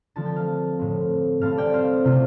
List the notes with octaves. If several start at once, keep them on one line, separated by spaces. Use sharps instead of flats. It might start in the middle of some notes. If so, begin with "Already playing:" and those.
D3 F3 A3 C4 A5
G5
F5 A5
A2 F3 C4
A2 G3 C4 F5 A5
D5 G5
C5 F5
C3 A3 C4 F4